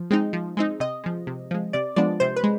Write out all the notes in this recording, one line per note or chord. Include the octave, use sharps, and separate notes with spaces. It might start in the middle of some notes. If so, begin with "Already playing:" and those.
Already playing: F3
G#3 C4 D#4
F3
G#3 C4 D#4
C3 D#5
F3 G#3
C3
F3 G#3
C3 D5
F3 G#3 B3 D4 D5
C3 C5
B4
G#3